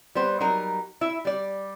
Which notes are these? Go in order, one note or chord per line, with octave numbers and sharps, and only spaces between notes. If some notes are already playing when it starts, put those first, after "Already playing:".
G3 B3 C5
F#3 G3 D#4 A#4
E4 E5
G3 D5